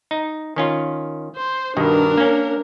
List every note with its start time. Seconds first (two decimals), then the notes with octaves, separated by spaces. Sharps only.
0.11 D#4
0.56 D#3 C#4 F4
1.36 C5
1.77 G2 B2 D#3 D4 A#4
2.17 A#3 C#4